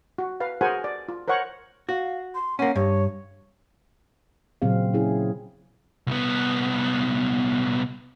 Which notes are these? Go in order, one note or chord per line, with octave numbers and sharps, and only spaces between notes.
F#4
B4 F5
F#4 G#4 A#4 C5 F#5 G#5
D5
F4
A#4 C5 C#5 F#5 C#6
F#4 F5
C6
A#3 C#4 F#5
G2 C#5
A#2 C#3 F#3 C4 G#4 F5
C#4 D4 E4 G#4
C2 B3